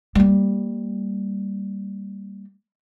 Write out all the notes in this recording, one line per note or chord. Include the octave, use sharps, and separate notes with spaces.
G3 A#3